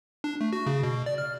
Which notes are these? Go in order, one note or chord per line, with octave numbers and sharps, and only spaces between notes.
D4
A3
F#4
C#3
B2
D5
F6